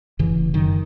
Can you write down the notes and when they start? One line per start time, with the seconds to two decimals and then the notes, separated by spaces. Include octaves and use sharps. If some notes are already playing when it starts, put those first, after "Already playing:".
0.19 F1 C#3 E3
0.54 F#2 D#3